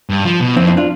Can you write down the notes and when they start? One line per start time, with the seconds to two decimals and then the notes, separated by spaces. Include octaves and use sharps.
0.10 G2
0.25 F3
0.41 B2
0.57 F2 C4 E4
0.67 C4 E4
0.77 D4 F4